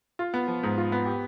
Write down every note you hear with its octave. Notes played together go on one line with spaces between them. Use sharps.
F4
B3
F3
G#2
F4
B3
G4